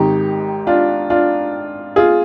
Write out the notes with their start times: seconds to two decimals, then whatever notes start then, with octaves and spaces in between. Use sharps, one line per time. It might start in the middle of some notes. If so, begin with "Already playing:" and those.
Already playing: G#1 G#2 D#3 D#4 G4
0.67 D4 F4
1.10 D4 F4
1.96 F4 G#4